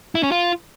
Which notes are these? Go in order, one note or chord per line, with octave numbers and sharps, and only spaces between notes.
E4
C#4
F4